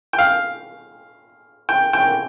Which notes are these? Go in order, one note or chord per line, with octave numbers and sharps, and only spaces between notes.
G5
F5
G5
G5